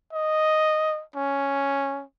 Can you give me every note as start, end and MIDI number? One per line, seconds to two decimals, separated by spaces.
0.13 1.02 75
1.16 2.03 61